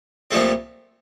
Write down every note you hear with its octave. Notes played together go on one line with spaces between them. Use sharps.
C2 A#2 F3 A3 C4